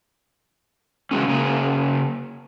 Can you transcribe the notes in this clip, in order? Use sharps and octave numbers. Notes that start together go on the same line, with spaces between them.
C#3 E3 F#3 G#3 C#4
C#3 A#3 G#4